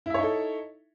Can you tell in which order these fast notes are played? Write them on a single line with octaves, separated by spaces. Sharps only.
E4 E5 C#5 D#4 A4